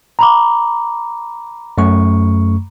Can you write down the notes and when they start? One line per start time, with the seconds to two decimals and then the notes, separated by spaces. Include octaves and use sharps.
0.19 A#5 B5 D6
1.78 F#2 A3 C#6